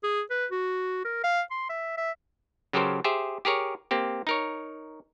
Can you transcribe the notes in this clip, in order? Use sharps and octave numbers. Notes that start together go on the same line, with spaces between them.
G#4
B4
F#4
A#4
F5
C6
E5
E5
C#3 F#3 G4 A4 A#4 C5
G4 G#4 C5 E5
G4 G#4 A#4 C#5
A#3 C4 G4
D#4 A#4 C#5